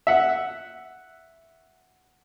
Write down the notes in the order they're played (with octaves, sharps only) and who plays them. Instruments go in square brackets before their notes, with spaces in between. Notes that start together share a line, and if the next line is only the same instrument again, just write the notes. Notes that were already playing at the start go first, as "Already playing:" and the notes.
[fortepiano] E5 F#5